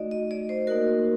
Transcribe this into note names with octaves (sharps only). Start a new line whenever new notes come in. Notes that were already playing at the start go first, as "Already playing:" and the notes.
Already playing: A3 D#4 F#4 D5 D#5
D#5
D5
C5
A#3 D#4 F#4 A#4